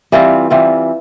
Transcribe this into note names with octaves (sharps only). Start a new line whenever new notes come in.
E3 G3 C4 F4
E3 G3 C4 F4